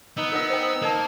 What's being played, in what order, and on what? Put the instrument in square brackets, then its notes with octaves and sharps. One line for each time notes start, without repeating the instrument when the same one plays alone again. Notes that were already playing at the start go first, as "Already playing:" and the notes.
[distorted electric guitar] B3 [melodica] D#4 E6
[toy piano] A#4 B4 E5
C5 G5
[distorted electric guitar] A#3 [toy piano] A#4 D#5 A5